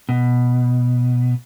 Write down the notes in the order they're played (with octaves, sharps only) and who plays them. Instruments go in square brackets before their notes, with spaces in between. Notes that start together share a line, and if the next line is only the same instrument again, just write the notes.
[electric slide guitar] B2